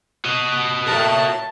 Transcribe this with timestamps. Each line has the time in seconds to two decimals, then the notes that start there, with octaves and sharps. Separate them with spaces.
0.25 F#4 D#5
0.87 A2 A#4 A5